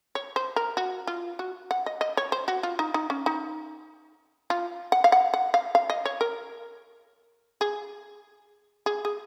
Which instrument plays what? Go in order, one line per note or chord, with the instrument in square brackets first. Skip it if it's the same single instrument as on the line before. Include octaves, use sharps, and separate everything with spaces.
[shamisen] C#5
C5
A#4
F#4
F4
F#4
F#5
D#5
D#5
C#5
C5
F#4
F4
D#4
D#4
C#4
D#4
F4
F#5
F5
F#5
F#5
F5
F5
D#5
C#5
A#4
G#4
G#4
G#4